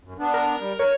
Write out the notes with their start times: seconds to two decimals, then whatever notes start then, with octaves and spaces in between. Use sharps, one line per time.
0.03 F#2
0.19 B3 D4
0.34 A#4
0.59 G3
0.79 A#4 C#5